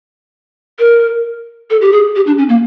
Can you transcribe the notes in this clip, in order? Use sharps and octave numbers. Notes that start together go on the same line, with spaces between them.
A#4
A4
G4
G#4
G4
D4
C#4
A#3